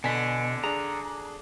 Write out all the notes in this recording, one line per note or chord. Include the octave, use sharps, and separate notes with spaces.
B2 D3 G#5 B6
D4 G#4 A#5